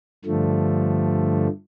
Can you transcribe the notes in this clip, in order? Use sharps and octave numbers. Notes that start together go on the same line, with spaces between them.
G2 D3 F3 A3